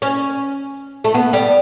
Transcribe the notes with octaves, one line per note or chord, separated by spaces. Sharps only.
C#4
A3
B3
G3